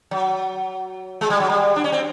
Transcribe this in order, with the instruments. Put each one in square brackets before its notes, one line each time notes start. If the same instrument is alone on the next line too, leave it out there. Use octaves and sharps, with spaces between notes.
[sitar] F#3
G#3
G3
F#3
G3
D4
C#4
C4